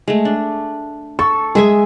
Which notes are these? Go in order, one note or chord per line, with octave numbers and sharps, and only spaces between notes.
G#3 A3
D4
A4 C#6
G#3 G#4 E5 G#5